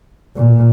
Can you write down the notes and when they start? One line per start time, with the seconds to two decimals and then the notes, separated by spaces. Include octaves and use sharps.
0.36 A#2